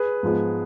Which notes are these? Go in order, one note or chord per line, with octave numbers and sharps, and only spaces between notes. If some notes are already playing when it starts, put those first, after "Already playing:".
Already playing: G#4 B4
G#2 F3 G#3 B3